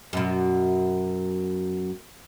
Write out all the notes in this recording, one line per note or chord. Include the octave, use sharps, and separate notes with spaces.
F#2 B2